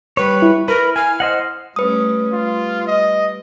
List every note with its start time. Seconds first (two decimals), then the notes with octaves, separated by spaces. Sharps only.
0.17 G3 B4 C#5
0.42 E4
0.68 A#4 B4
0.96 G#5 F6
1.20 C5 D#5 F#5
1.76 G3 A3 C#4 B4 D#6
2.33 G3 F4
2.87 D#5